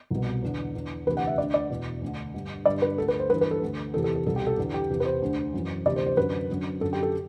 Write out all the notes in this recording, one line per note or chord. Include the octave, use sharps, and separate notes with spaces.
C2 B2
E2 D3
E2 D3
D2 C3 E3 B4
F#5
E5
D2 D5
D3
D5
E2 B2
D2
D3
G2 D3
G2 D3 D5
B4
D2 D3 A4
B4
C5
G2 E3 B4
B4
A4
D2 D3
E2 C3 E3 A4
A4
A4
C2 B2 A4
G4
A4
E2 D3
G4
E2 C3 E3
B4
C5
D2 D3
F#2 E3
D2 C3 E3 D5
C5
C5
F#2 D3 B4
F#2 D3
F#2 D3 A4
G4
A4